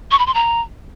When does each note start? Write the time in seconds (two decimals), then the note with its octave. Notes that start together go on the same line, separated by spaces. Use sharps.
0.11 C#6
0.19 B5
0.27 C6
0.34 A#5